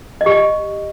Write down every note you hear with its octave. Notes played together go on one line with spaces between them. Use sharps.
D#5
G4
D#5